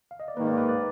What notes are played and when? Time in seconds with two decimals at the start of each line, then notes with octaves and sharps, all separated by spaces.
0.11 F5
0.20 D#5
0.28 D5
0.37 G#2 D#3 A#3 B4
0.47 D5
0.58 B4
0.69 D5